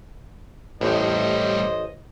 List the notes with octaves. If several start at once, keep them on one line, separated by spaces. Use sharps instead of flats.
A1 A2 G3 C5 D#5